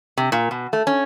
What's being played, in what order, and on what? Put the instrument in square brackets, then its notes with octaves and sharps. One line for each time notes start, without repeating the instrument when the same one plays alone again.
[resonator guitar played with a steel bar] C3
A#2
B2
A3
C#4